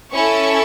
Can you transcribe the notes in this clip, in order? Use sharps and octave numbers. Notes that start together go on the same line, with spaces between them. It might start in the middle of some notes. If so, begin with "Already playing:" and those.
C#4 E4 A4 C#6